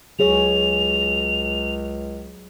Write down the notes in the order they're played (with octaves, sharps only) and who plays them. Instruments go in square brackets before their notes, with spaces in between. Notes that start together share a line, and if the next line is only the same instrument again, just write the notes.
[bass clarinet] C#2 [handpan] F#3 G#4 C#5 [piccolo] F7